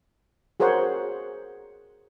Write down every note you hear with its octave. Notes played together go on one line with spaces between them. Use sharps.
F#4 G#4 A#4 C5 C#5 F#5